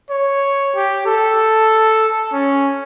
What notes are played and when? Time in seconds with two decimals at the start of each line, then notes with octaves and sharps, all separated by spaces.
0.10 C#5
0.76 G4
1.06 A4
2.32 C#4